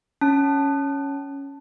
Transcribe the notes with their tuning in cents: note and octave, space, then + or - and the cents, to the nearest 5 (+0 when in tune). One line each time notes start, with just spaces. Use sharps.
C#4 +0 A5 +0